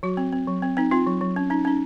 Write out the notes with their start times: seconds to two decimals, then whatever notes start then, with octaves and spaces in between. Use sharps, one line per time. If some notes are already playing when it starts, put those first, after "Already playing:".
0.03 F#3 F#4
0.17 C4
0.32 C4
0.48 F#3
0.62 C4
0.77 C4 D#4
0.91 C4 F4
1.07 F#3
1.21 F#3
1.36 C#4
1.50 C#4 D#4
1.65 C#4 D#4